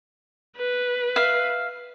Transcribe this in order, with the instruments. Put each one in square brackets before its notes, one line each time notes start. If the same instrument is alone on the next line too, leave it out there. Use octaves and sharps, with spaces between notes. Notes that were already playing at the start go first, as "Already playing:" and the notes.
[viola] B4
[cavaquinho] E5 F5